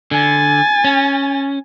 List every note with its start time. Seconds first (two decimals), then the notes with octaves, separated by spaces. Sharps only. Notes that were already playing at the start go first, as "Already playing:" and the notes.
0.11 D3 G#5 A6
0.84 C#4